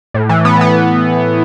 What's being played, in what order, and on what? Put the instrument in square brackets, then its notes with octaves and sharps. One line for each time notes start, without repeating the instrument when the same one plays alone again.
[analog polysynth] A2
E3
B3
B3